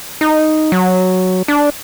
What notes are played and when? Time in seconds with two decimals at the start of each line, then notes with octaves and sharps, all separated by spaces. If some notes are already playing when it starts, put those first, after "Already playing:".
0.21 D#4
0.72 F#3
1.48 D4